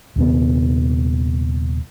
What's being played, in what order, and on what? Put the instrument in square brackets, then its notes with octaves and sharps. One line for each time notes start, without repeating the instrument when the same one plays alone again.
[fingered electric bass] D#1 D#2 C3 B3